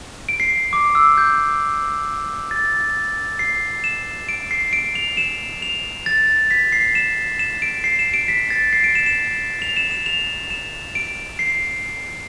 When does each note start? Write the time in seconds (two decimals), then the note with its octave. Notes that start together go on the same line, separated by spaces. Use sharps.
0.29 D7
0.40 C7
0.73 D6
0.95 E6
1.18 G6
2.51 A6
3.39 C7
3.84 E7
4.29 D7
4.51 C7
4.73 D7
4.95 F7
5.17 E7
5.62 F7
6.06 A6
6.51 B6
6.72 C7
6.95 E7
7.39 E7
7.62 D7
7.84 C7
7.99 E7
8.14 D7
8.28 B6
8.50 A6
8.73 C7
8.84 D7
8.95 E7
9.06 E7
9.62 F7
9.77 E7
9.91 E7
10.06 F7
10.50 E7
10.95 D7
11.39 C7